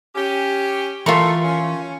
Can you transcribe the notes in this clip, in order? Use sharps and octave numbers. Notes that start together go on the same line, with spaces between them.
C#4 G4
E3 A3 F4 A#4 E5 C#6
C#4